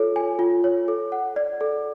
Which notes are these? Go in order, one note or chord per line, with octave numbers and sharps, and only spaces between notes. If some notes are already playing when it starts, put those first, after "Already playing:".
Already playing: F4 A4 C#5
G#5
F4
C#5
A4
F#5
D5
A4